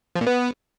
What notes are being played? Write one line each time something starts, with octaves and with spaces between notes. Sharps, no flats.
F3
A#2
B3